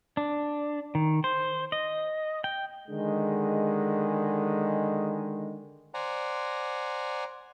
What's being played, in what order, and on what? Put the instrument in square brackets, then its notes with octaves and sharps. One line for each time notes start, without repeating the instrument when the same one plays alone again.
[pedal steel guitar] D4
D#3
C5
D#5
G5
[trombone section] D3 D#3 G#3
[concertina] C5 D5 F#5 G#5 A#5